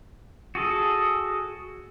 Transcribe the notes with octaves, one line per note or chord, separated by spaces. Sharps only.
F#4 G#4 A4